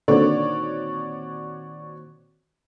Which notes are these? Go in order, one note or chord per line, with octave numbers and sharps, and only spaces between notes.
A#2 D3 D#3 C4 F#4 C#5 D5